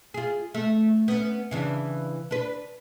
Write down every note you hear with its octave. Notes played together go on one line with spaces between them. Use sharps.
F4 G#4
A3
B3 C#4
C#3 E3 D4
D4 B4